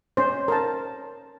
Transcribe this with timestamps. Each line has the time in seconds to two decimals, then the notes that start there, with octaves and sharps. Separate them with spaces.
0.17 C#4 C5
0.48 A#4 A5